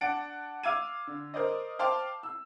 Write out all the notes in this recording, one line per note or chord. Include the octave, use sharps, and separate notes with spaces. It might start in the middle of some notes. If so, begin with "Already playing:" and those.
D4 F#5 A5 A6 D7
F5 D6 E6 G#6 D#7
D3
A#4 C5 D5 D#5
C5 F5 G5 A5 C6 D6
E6